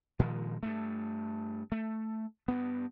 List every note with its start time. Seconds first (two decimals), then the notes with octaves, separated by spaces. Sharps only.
0.19 A#2 D#3 F3 G#3
0.63 G2 A3
1.72 A3
2.48 G2 B3